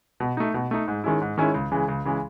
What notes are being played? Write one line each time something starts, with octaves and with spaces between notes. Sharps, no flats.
B2
A3 D#4
B2
A3 D#4
G#2
D#3 G#3 C#4 E4
G#2
D#3 G#3 C#4 E4
C#2
C#3 E3 G#3
C#2
C#3 E3 G#3